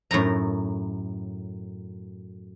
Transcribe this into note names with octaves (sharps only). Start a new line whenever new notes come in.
F#2 A2 D#4 A#5